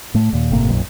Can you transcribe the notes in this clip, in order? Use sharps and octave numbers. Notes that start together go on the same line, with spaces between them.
A2 A3
D#2 A#2
G1 A2 C3 A#3
B1 F#2 A#2